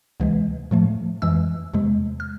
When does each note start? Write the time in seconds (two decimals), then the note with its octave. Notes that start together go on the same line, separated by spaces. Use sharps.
0.20 D2 C3 E3 G#3
0.71 A2 F3 A3
1.22 F2 E3 G#3 E6
1.74 E2 C3 G#3
2.20 F6